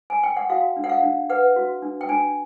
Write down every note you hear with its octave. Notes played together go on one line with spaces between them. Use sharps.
G#5
G5
F#5
F#4 F5
D4
F#5
F5
D4
B4 F#5
F#4
D4
G5
D4 G#5